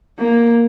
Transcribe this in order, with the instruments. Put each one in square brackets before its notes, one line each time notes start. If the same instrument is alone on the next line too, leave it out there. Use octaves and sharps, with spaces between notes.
[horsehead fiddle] A#3